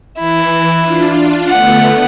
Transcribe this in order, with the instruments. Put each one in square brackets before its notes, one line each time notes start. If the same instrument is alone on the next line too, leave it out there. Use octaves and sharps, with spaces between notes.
[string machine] E3 [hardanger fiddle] E4
[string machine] D4 F4
[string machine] D3 A3 B3 [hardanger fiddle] F#5